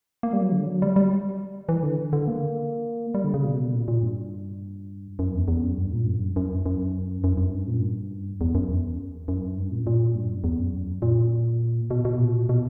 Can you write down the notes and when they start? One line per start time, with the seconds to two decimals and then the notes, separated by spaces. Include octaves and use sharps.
0.23 A#3
0.33 G3
0.42 F#3
0.52 D3
0.67 F#3
0.82 G3
0.96 G3
1.69 E3
1.83 D3
2.13 D3
2.28 A#3
3.14 G3
3.24 D3
3.34 C#3
3.45 B2
3.74 A#2
3.88 A#2
4.03 G2
5.19 F#2
5.34 E2
5.48 E2
5.64 F#2
5.77 G2
5.93 A#2
6.07 F#2
6.15 G2
6.25 F#2
6.36 F#2
6.66 F#2
7.24 F#2
7.37 F#2
7.53 G2
7.68 A#2
7.81 G2
8.41 E2
8.55 F#2
8.70 E2
9.28 F#2
9.57 G2
9.72 A#2
9.87 A#2
10.15 G2
10.30 F#2
10.44 E2
10.59 F#2
11.02 A#2
11.91 B2
12.05 B2
12.19 A#2
12.49 B2